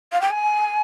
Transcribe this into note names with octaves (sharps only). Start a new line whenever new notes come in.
F5
G5
G#5